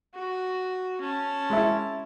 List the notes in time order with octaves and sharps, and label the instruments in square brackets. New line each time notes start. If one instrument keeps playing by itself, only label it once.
[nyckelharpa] F#4
C#4 A5
[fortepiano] G#3 E4